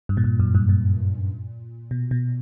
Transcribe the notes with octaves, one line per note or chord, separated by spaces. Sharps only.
G2
A#2
G2
F#2
G2
A#2
B2
B2